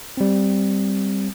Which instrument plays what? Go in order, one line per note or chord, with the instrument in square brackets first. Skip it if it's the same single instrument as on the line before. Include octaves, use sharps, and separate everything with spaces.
[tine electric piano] G3 C4